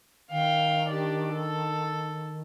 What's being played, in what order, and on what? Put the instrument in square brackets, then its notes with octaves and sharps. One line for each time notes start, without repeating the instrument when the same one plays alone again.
[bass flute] D#3 [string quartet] F5 G5
[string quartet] D4 G4 D5
A4